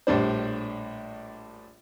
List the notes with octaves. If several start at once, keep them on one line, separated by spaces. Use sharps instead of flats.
A#1 A2 G3 D4 C5